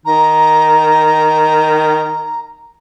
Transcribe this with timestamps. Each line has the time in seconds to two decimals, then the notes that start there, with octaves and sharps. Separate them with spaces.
0.06 D#3 A#5